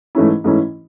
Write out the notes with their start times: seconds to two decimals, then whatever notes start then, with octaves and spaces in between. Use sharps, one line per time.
0.15 G#2 E3 A3 C#4 E4
0.44 G#2 E3 A3 C#4 E4